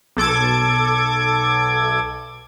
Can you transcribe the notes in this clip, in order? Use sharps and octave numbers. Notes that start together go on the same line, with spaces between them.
B1 A4 D6 G#6